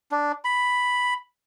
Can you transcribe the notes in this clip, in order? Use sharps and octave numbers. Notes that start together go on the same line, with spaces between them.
D4
B5